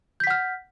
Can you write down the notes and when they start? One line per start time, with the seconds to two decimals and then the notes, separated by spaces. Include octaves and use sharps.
0.20 G6
0.24 B6
0.27 F#5
0.30 F6